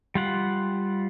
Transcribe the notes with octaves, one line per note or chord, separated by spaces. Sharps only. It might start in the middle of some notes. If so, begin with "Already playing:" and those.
G3 F4 F#5